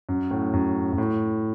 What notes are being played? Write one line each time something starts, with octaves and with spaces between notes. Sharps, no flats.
F#2
A2
F#2
F#2
A2